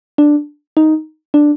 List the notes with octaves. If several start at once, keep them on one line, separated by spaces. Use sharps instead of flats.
D4
D#4
D4